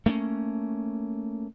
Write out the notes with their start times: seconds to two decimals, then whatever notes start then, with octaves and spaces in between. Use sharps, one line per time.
0.06 A3 A#3 C4 C#4